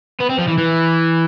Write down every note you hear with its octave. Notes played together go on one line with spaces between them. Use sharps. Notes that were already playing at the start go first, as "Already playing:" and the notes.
B3
C4
F3
E3
E3